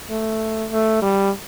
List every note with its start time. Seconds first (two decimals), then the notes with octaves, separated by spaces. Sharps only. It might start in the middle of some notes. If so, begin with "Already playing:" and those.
0.10 A3
0.71 A3
1.02 G3